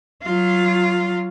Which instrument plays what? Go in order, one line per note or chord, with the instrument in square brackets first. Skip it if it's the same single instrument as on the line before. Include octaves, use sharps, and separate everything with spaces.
[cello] F#3 F4